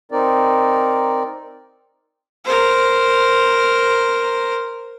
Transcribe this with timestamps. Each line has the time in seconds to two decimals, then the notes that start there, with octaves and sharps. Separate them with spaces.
0.12 C4 D#4 A#4 D5
2.45 A#4 C5